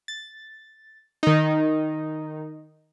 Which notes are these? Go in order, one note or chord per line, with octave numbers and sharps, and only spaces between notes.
A6
D#3 D#4